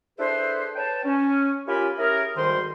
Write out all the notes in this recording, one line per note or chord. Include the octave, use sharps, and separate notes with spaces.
D4 E4 G#4 A4 B4 C5
B4 C#5 G5 A5
C#4
C#4 F4 G4 A#4 G#5 B5
C#4 E4 G4 G#4 A#4
D2 G#2 D#3 G3 C5 C6